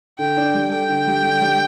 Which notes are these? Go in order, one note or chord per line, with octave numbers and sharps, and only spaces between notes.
D3 G5
D4
G3
A4 G5
D3
G3
D3
G3